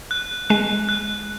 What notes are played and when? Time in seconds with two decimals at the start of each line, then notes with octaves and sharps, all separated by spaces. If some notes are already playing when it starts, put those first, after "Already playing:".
0.11 F#6
0.50 G#3 F#6
0.89 F#6